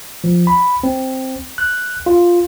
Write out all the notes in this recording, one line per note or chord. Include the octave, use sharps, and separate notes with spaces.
F3
B5
C4
F#6
F4